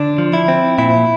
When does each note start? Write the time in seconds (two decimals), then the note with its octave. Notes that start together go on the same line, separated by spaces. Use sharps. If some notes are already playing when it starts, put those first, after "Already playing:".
Already playing: D3 D4
0.18 F3
0.33 E4
0.48 C4
0.78 A#2 E4